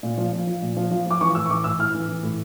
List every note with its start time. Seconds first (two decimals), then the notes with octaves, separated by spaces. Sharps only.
0.03 A#2
0.18 F3
0.32 F3
0.47 F3
0.62 A#2
0.77 F3
0.91 F3
1.06 F3 D6
1.21 E3 C#6
1.35 A2 E6
1.46 C#6
1.50 E3 D6
1.64 A2 E6
1.79 A2 F6
1.95 E3
2.08 E3
2.23 A2